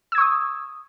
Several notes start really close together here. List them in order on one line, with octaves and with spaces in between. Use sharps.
E6 G#6 C#6 D#6